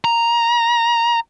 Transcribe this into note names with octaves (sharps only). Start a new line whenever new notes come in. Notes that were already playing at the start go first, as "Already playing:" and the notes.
A#5